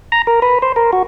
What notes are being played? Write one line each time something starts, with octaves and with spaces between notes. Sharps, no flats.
A#5
A#4
B4
C5
A#4
F#4